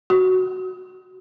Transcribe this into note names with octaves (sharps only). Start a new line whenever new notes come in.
F#4